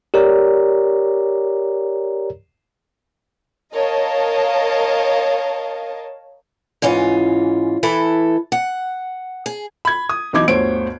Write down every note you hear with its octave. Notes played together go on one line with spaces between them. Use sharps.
G4 A#4 C#5 D5 A#5
A#4 C#5 D#5 F5 A5
G#2 E3 C#4 F4
E3 E4 A4
F#5
G#4
B5 G#6
D#6
B1 E3 D#4 D6 G#6
G1 D2 C5 C#5 D7